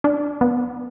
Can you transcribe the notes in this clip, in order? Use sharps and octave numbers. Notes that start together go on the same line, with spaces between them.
D4
B3